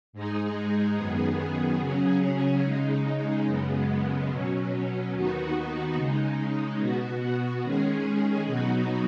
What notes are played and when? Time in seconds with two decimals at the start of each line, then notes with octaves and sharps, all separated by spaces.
0.13 G#2 G#3 D#4 G#4
0.96 F#2 D#3 B3 G#4
1.79 C#3 F#3 C#4 G#4
2.62 C#3 G#3 D#4
3.46 F#2 C#3 G#3 B3
4.30 B2 F#3 C#4
5.13 D#2 D#3 B3 D#4 F#4
5.96 C#3 G#3 D#4
6.80 B2 B3 F#4
7.63 D#3 G#3 C#4 G#4
8.46 B2 F#3 B3 D#4 F#4